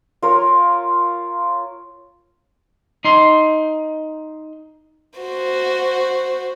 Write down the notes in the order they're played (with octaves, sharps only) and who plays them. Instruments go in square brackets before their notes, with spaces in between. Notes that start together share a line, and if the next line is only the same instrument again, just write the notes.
[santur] F4 A#4 C#5
[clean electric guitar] D#4 C6
[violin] F#4 C5